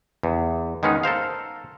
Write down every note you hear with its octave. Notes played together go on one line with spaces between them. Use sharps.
E2
D#3 G#3 B3 C#4 D#4
A4 A#4 C5 F5